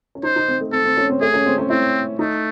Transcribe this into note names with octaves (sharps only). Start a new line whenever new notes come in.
C#4
D#4 C5
D#4
C4
A3
C4 A4
C4
C#4
C4
A3 G#4
C#4
C4
C#4
C4 E4
A3 D#4